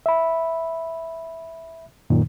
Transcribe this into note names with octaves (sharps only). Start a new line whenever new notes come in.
E5 B5
F#2 A#2 D#3